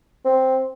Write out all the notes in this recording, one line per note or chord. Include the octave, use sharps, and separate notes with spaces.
C4